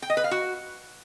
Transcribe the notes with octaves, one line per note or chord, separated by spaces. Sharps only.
G5
D#5
B4
F5
F#4